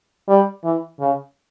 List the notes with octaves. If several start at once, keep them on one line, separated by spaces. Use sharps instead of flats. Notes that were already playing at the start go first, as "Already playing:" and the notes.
G3
E3
C#3